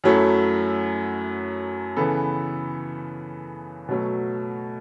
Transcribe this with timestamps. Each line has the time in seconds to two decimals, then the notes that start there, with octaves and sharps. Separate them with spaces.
0.04 F#2 F#3 A3 E4 A4
1.97 C#3 E3 B3 A4
3.89 B2 F#3 A3